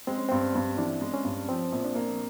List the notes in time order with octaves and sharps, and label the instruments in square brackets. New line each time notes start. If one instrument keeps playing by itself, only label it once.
[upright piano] G#3 [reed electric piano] C4
[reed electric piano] C#4
[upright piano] G2 [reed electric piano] C4
[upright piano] G2
[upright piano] E3 [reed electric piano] D4
[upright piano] G#3
[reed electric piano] C#4
[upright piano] G2
[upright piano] F3 [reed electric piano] C4
[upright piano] A#1
[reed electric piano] D4
[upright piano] A#3